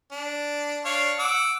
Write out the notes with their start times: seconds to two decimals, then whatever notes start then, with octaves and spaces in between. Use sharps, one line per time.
0.12 D4
0.85 D4 C#5 F5
1.19 F#5 D6 E6